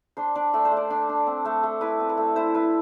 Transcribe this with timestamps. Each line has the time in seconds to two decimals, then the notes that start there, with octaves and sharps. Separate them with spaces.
0.17 D4 C5
0.35 D4 D5
0.54 A3 D5
0.65 C5
0.71 A3
0.77 D5
0.90 D4
1.09 D4
1.27 C4
1.45 A3
1.63 A3
1.81 E4 B4
2.00 C4
2.09 B4
2.17 A3
2.36 E4 C5
2.54 E4 B4